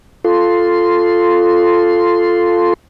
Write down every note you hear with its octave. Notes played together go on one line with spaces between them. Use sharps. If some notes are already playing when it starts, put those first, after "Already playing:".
F4 A4 C6